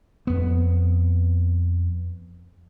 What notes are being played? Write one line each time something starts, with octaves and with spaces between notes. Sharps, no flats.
F2 B3